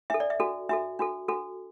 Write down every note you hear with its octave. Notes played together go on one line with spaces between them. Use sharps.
D4 A4 E5
D5
E5
D4 F#4 A4
D4 F#4 A4 E5
D4 F#4 A4
D4 F#4 A4